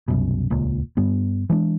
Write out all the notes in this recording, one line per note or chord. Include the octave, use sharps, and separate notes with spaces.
C2 F#2 B2
D#1 C#2 A#2
G2 G3 B3
E3 G#3 C4 D4